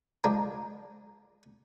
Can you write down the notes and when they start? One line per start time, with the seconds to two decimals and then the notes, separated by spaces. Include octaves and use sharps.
0.24 F3 G#3 D4 A#5